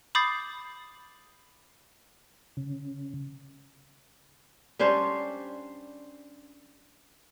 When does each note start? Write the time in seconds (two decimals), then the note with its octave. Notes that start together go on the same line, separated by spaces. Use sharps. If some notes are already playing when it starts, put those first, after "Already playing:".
0.15 B5 D6 D#6 G6 A6 C7
2.57 C#3
4.79 G3 C#4 D4 C5